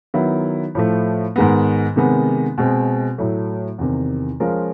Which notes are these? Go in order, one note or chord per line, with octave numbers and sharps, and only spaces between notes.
D#3 F#3 B3 E4
A2 F3 A3
G#2 D#3 G#3 B3
C3 D#3 G#3 B3
B2 G#3 C4
A2 F#3 A3
E2 C3 D#3
F3 G#3 C#4 F4 A#4